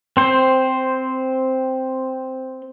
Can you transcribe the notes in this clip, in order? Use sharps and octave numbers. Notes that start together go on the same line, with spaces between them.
C4 C5